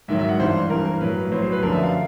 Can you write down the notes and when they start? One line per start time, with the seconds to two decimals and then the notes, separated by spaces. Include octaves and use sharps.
0.08 G#2 D#3 F#3 E5
0.19 E5
0.29 F#5
0.40 G2 E3 C5
0.70 G2 E3 A#4
0.85 A#4
1.01 A2 F#3 B4
1.32 A2 F#3 C5
1.42 C5
1.52 B4
1.63 F#2 D3 F3 A#4
1.73 E5
1.83 F5